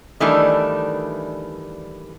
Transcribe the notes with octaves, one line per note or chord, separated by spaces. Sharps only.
D#3 E3 G3 A3 D4